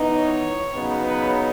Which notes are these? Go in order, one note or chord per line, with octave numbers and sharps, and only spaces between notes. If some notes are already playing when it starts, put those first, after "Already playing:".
Already playing: E3 B3 D#4
C#5
C#3 F#3 B3 D#4
B4